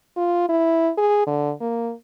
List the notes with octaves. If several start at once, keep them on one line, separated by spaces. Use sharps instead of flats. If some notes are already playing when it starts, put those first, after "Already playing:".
F4
E4
G#4
D3
A#3